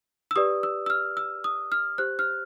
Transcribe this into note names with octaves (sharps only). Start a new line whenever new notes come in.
E6
G4 B4 D5 D#6
E6
E6
F6
E6
D#6
F6
G4 C5 F#6
F6